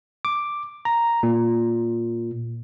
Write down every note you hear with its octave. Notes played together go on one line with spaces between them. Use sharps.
D6
A#5
A#2